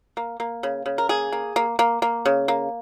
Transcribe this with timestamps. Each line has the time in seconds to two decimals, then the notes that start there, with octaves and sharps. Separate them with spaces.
0.17 A#3
0.40 A#3
0.63 C#3
0.86 C#3
0.98 A#4
1.09 A#3 G#4
1.32 A#3
1.56 A#3
1.79 A#3
2.02 A#3
2.26 C#3
2.48 A#3